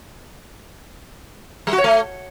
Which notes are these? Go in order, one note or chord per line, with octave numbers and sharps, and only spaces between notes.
G3
F#4
C#5
A3